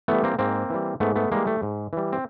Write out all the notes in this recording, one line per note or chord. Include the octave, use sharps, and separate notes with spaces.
E3 G3 A3 B3
A#3 C4
G#2 A#3 C4
E3 G3
G#2 A3 B3
A3 B3
E3 G3 G#3 A#3
A3
G#2
E3 G3
C4